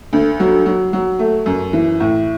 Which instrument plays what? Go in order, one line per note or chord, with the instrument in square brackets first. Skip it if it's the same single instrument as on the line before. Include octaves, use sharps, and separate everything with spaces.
[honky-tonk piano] D2
F#3
F#3
F#3
A3
F#2
E3
A2